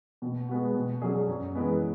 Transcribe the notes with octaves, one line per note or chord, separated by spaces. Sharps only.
B2
G#3 B3 F#4
B2
F#3 C#4 G#4 D5
F#2
E3 G#3 B3